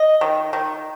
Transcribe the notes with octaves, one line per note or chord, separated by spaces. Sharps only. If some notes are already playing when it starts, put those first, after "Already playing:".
Already playing: D#5
D#3
D#3